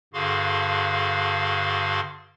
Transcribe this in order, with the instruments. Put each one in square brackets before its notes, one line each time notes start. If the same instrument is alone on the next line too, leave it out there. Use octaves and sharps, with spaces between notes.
[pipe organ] G2 D3 F#4 G#4 F5 C6